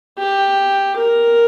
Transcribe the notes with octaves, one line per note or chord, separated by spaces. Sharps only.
G4
A#4